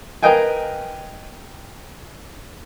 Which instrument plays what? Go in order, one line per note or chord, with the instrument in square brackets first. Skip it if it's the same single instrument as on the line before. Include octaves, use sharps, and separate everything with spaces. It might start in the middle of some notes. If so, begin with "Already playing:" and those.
[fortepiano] A#4 B4 D#5 F5 G5 G#5